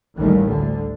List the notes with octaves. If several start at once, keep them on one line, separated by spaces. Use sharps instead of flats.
A1 D#2 A2 D#3 E3 G3
D2 D3